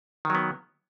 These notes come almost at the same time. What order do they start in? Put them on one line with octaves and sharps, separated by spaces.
D#3 F#3 B3